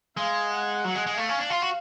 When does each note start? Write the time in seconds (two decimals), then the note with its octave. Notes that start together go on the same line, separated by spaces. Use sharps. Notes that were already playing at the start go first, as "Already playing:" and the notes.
0.17 G#3 F5
0.51 F#5
0.84 F#3
0.95 G#3
1.07 G#3
1.17 A3 F5
1.29 C#4
1.39 D4
1.50 F4
1.62 F#4